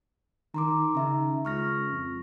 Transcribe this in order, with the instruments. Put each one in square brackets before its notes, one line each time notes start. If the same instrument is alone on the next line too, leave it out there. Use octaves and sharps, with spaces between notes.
[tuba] D#3 [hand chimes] A#5 C6 D6
[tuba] C#3 [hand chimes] D#4 E5 A#5
[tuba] C#2 [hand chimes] C#6 F6 A#6
[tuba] F2